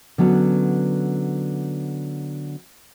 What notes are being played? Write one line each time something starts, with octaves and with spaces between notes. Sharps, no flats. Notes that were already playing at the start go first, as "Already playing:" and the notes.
D3 F#3 B3 C#4